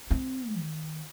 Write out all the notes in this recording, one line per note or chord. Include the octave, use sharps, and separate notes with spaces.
C4
D#3